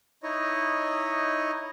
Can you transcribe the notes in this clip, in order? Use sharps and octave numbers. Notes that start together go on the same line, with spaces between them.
D#4 E4 C#5 D#5